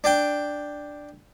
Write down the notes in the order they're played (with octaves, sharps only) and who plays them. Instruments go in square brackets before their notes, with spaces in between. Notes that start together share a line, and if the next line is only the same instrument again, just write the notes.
[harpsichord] D4 G5